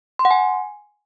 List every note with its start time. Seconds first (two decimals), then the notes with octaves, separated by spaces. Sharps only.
0.19 C6
0.25 F#5
0.31 G#5